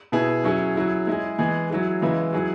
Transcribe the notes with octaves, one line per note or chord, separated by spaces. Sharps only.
B2 B3 E4 G#4
F#3 C#4 E4 G#4
F#3 E4 G#4
G#3 E4 G#4
E3 G#3 B3 G#4
F#3 E4 G#4
C#3 E3 G#3 E4
F#3 E4 G#4